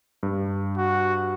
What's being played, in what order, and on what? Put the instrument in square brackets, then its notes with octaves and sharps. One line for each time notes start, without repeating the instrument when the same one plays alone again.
[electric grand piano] G2
[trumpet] F#4